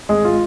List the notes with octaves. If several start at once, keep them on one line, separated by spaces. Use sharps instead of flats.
G#1 G#3 G#4
F4